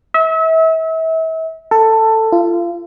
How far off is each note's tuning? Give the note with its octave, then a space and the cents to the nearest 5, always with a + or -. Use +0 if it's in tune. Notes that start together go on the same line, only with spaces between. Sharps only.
E5 -35
A4 +15
F4 -30